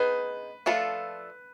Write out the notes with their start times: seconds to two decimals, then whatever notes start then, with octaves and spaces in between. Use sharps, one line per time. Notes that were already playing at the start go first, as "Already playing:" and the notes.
Already playing: B3 D#4 G#4 B4 C5
0.66 F3 A3 D4 F4 A4